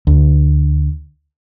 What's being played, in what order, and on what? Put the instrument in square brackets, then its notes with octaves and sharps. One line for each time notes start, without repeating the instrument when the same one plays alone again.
[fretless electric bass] D2